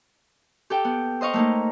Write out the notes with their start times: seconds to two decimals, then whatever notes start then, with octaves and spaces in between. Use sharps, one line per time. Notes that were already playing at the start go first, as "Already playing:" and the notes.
0.70 G4 A4 G5
0.84 B3
1.21 C5 D#5 F5 C#6
1.33 A3 A#3 D#4